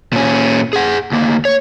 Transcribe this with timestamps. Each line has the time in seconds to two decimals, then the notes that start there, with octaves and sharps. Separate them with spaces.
0.13 A#2 C#4
0.73 G#4 F#5
1.12 D2 A#3
1.45 C#5